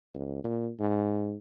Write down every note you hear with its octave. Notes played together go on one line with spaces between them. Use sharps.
C#2
A#2
G#2